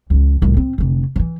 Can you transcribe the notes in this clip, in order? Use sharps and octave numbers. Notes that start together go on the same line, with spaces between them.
C#2 E3
C2 A2
C4
F1 D3
E3 F3